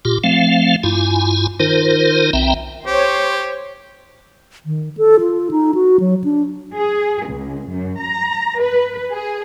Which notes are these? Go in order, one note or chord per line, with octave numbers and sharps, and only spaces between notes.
A#2 F4 G4
F3 A3 C4 F5
G2 E4 F4 G#5
D#3 D#4 F4 A#4 C5
B1 C4 E5 G5 A#5
G4 C5 C#5
D#3
A4
F4
D#4
F#4
F#3
D4
G#4
C#2
F#2
A#5
B4
G#4